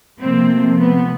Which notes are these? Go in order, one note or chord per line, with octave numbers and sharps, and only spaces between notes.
C3 F3 A3 A#3 C4
B3